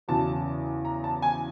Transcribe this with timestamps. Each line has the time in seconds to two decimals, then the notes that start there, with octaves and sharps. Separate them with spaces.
0.08 E2 C#3 F#3 A5
0.85 A#5
1.04 A5
1.22 G#5